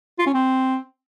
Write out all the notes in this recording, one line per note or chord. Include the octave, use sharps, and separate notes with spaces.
F4
C#4
C4